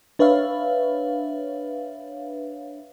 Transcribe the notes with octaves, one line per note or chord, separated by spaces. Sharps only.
D4 B4 C#5 E5 F5